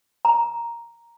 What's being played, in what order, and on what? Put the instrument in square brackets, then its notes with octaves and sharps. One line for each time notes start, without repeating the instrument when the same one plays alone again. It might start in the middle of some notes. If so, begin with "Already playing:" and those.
[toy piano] A#5